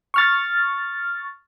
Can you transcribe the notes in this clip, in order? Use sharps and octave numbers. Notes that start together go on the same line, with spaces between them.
C#6 F6 A6